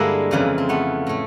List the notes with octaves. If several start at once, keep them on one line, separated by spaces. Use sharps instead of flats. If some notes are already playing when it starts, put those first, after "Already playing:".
Already playing: G2 D3 G3 G#3 A#3 D4 E4
F2 C#3 E3
C4
A3 B3
A2 A3